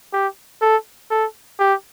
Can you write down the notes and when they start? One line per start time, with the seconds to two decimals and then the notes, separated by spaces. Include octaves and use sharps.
0.13 G4
0.62 A4
1.11 A4
1.59 G4